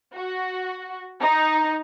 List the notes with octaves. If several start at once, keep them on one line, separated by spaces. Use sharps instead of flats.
F#4
D#4